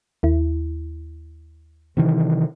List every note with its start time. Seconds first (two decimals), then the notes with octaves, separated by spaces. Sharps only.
0.23 D#2 E4
1.97 C3 D#3 E3